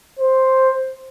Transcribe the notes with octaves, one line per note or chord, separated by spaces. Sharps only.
C5